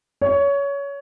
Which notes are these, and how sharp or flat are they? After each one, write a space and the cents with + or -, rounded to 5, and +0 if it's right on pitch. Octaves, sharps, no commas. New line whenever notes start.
C#5 +20